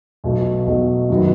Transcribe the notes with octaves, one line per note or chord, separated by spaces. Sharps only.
B1 B2 F#3 A3
B1 B2 F#3 A3
F#2 D#3 F#3 B3